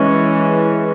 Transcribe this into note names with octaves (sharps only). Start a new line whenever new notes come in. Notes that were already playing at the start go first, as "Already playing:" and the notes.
Already playing: E3 G#3 C#4